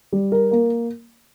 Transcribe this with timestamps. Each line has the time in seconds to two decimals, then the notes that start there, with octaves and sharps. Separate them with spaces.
0.13 G3
0.32 A#4
0.51 A#3